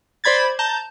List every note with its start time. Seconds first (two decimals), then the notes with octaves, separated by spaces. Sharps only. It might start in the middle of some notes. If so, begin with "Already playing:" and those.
0.24 C5 D5 B5 G#6 A6
0.59 A5 A#5 G6